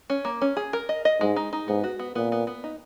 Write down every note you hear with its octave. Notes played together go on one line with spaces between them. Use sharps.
C#4
A#3
C#4
G#4
A#4
D#5
D#5
G#2 G#3
D#4
D#4
G#2 B3
F#4
B3
A#2 B3
B3
B3
D#4